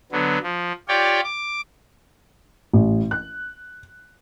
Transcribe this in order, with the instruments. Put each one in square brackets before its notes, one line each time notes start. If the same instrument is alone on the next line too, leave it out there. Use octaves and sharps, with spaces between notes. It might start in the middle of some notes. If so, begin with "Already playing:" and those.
[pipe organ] D3 F#3 B3
F3
F4 G4 C#5 D5 G5
D6
[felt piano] A1
F#6